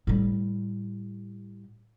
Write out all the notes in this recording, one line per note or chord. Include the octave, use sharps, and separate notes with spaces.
A2 G3